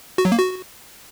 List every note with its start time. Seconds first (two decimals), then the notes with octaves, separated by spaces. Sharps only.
0.18 F#4
0.25 F#3
0.32 A#3
0.39 F#4